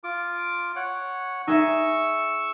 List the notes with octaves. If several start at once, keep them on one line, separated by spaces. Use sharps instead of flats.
F4 D6
C#5 F#5
D#4 G#4 E5 C#6 E6